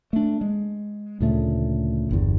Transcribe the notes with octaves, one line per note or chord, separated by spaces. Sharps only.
A3 D4
G#3
D2 A#2 C#3 A3
G1 E2